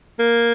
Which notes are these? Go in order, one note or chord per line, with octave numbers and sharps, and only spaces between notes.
A#3